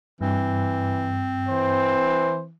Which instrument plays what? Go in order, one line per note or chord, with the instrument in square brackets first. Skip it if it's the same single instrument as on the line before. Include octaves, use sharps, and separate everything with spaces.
[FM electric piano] G2 [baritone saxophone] E3 [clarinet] C4
[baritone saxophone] E3 [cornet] C5